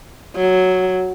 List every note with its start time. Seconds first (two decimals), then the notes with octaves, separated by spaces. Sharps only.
0.36 F#3